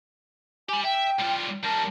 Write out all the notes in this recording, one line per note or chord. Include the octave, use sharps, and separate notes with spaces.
G4 G#5 B5
E5 G5
G3 F4
G3 A#4 A5